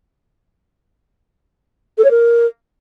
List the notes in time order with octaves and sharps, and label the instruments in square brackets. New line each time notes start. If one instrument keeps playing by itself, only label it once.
[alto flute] A4
C#5
A#4